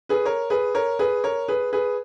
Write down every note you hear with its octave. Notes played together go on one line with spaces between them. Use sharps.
G#4 B4
A#4 C#5
G#4 B4
A#4 C#5
G#4 B4
A#4 C#5
G#4 B4
G#4 B4